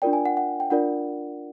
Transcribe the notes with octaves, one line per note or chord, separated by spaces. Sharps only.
D4 F4 A#4 D5 G5
G#5
F#5
F#5
G5
D4 F4 A#4 D5 F#5